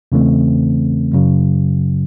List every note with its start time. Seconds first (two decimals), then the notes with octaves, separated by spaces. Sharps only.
0.12 E2 C#3 E3 A3 C4
1.13 F#2 C#3 F#3